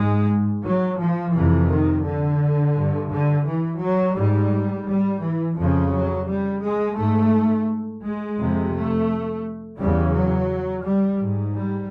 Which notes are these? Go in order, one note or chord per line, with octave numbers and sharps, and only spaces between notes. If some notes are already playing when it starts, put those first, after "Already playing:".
Already playing: G#2 G#3
F#3
F3
F2 C3 E3
D#3
D3
G2
D3
E3
F#3
G#2 G3
G3
E3
F2 C#3 F3
F#3
G3
G#3
G#2 A3
G#3
F2 C3
A3
E2 C#3 G3
F#3
G3
G#2
G3